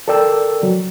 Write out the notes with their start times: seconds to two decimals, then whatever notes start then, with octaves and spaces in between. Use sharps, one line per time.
0.08 A4 A#4 D5 G5 E6
0.63 F#3